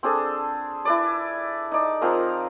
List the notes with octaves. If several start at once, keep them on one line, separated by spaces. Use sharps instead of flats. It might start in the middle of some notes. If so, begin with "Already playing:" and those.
C4 D4 G#4 A4
E4 B4 D5
D#4 D5
F3 C4 G#4 A#4